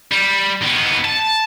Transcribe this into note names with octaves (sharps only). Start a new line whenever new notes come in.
G3
D#3 B3
A5